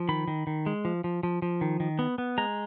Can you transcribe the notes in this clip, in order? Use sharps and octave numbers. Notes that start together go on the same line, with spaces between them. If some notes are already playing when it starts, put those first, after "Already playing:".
Already playing: F3
D#3 B5
D#3
D#3
G#3
F3
F3
F3
F3
D#3
D#3
B3
B3
G#3 A#5